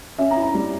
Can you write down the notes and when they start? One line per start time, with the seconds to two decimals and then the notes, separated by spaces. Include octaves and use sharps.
0.18 C#4 E5
0.31 A#5
0.37 E4
0.42 A#5
0.54 G3